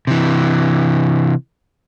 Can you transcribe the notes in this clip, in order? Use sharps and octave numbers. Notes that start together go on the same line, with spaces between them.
C3 E3